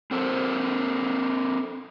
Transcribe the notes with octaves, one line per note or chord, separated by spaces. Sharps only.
C4 A4 A#4 C5